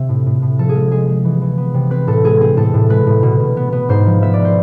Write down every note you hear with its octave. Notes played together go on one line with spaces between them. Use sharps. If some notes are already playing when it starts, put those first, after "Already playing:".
Already playing: C3 C4 E5
A2
A2
A2
F3 A4
G#4
G#3
G#3 G#4
G#3
E3
E3
B3
C3
C4 B4
A2 A4
G#3 G#4
C4 G#4
A2 A4
A2
G#3 B4
A2
B2
B2
B3
B3
G#2 C5
F3
B3 E5
D5
B3
C5